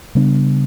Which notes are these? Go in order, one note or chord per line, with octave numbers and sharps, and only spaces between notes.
C#3 G3 B3 D4